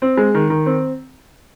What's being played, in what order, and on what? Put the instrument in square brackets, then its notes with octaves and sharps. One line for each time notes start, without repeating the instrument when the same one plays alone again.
[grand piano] C4
G#3
D#3
D#3
C4